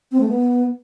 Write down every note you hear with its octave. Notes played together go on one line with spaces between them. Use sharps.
C4
A3
B3